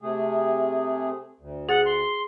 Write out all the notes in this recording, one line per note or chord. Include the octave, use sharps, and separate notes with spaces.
C3 A3 G#4
D2
G#4 F#5 A6
C6